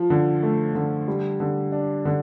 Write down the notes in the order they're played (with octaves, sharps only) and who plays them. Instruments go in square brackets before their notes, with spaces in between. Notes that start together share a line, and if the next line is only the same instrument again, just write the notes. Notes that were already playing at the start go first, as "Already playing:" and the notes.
Already playing: [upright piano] F3
D3
A3
D3
G3
D3
D4
D3